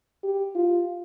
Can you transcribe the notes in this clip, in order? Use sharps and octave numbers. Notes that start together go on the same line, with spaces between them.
G4
F4